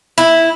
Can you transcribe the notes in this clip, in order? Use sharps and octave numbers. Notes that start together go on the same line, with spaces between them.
E4